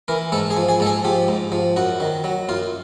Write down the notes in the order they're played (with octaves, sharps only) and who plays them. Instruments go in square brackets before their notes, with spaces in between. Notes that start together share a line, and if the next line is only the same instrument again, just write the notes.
[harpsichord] E3 A#4
G#2 A4
G#4
F3
G#4
G#2 A4
G#4
F3 G4
G#2
F3
F#2 F#4
D#3
F#3
F#2 F4